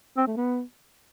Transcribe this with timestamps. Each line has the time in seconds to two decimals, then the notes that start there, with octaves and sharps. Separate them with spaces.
0.17 C4
0.27 A3
0.37 B3